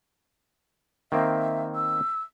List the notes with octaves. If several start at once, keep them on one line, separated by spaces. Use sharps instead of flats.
D#3 A#3 C4 E5
E6